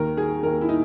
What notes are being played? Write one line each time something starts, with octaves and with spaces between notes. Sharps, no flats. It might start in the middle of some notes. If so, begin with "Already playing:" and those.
Already playing: D#2 D#3 A#4
G#4
D#2 D#3 A#4
E4
D#4